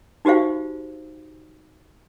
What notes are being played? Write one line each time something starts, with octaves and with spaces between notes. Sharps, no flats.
D#4 F#4 G4 C5 F5